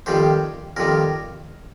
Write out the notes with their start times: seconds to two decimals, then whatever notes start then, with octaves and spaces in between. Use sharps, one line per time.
0.06 F2 C3 D#3 G3 C5
0.76 F2 C3 D#3 G3 A#4